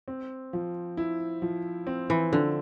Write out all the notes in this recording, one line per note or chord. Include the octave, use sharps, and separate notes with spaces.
C4
F3
E4
F3
C4
E3
D3 F3